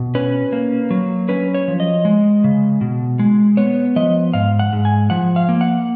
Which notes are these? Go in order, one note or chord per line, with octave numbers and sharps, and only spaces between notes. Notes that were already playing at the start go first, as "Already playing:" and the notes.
Already playing: B2
C#4 B4
A#3
F#3
C#4 B4
C#5
F3
D#5
G#3
C#3
B2
G#3
B3 C#5
F3 D#5
G#2 F5
F#5
G#2
G#5
F3 F#5
F5
A#3
F#5